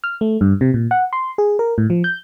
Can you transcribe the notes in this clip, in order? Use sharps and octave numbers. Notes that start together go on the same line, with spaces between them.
F6
A3
G2
C3
A#2
F#5
C6
G#4
A#4
A2
F3
G6